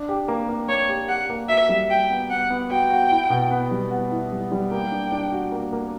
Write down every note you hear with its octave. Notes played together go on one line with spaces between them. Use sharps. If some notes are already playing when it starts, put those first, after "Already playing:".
Already playing: D4
G4
A#3
A#3
A#3 C#5
G4
G4 F#5
A#3
F#4 E5
G3
F#4 G5
B3
B3 F#5
B3
F#4 G5
F#4
E4
B2
B3
G3
B3
E4
G3
G3
A#3 G5
D4
D4
F#4
A#3
A#3